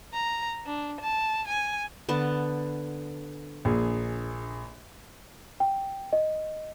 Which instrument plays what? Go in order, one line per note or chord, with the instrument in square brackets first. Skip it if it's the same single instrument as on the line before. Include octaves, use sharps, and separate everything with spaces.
[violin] A#5
D4
A5
G#5
[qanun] D3 B3 A5
[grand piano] A#1 G#4
[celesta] G5
D#5